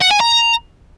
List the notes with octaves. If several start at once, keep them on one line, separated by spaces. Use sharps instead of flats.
F#5
G#5
A#5